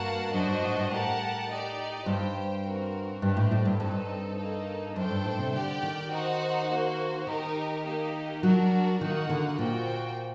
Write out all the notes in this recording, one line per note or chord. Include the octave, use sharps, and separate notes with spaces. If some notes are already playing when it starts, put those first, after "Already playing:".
Already playing: G2 A#3 F#4 A#4 F#5 A5
F#2 D4 F#4 C5 D#5
G2
A2
G2
A2 G4 A#4 F#5 A5
D#4 G4 D5
G2 G4 C5 G5
C4 F#4 A#4
G2 D4 G4 C5
A2
A2
G2
G2 C4 D#4 A4
A#3 D#4 A4
F#2 D4 A4 C5 G5
G2
A2
C3
D3 G4 D5 G5
D#3
D#4 F#4 C5 F#5
A#3 F#4 C5
D#3 D#4 G4 A#4
A#3 D#4 G4
F#3 D4 F#4 A#4
D#3 A#3 D#4 F#4 A#4 F#5
D3
A#2 A#3 F#4 C5 G5